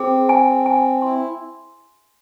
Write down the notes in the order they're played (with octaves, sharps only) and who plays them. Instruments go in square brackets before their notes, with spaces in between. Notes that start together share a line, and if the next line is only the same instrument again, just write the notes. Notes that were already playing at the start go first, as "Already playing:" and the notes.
Already playing: [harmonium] C4 [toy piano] G#4
[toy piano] G#5
G#5
[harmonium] E4 [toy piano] C6